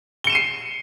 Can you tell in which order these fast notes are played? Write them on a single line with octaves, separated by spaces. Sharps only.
G7 C#7 E7 D#7 C7